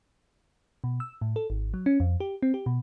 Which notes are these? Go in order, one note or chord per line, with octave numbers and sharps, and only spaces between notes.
B2
E6
A2
A4
G#1
F#3
C#4
F2
G4
C4
G4
B2